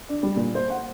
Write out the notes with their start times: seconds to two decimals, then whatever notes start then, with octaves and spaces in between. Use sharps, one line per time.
0.09 D4
0.23 G3
0.36 A#2
0.55 C5
0.70 F#5